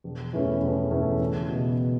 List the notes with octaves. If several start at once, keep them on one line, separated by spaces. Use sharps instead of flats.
E1
E2 E3 A3 C#4
E1
E2 E3 A3 C#4
C#2
B2 B3 F#4